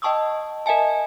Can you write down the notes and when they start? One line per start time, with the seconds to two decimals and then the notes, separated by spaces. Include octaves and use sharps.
0.02 D#5 G5 A5 C#6 D#6 E6
0.66 A#4 D#5 E5 G#5 A5